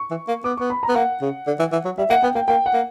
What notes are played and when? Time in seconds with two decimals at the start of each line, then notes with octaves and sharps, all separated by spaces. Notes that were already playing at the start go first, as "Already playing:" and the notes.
Already playing: C#6
0.10 E3
0.28 A#3
0.44 B3 D6
0.57 B3 C#6
0.70 B5
0.83 A#5
0.89 B3
0.95 A#3 F#5
1.21 C#3
1.47 D3
1.59 E3
1.72 E3
1.85 F#3
1.98 G3 E5
2.10 A#3 F#5
2.23 B3 G5
2.35 A#3 G5
2.48 A#3 G5
2.66 F#5
2.73 A#3